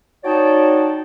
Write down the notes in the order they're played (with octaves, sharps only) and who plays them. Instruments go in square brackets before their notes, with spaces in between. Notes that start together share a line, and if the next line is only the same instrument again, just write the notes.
[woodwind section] D#4 F#4 C#5 D5 G5 A5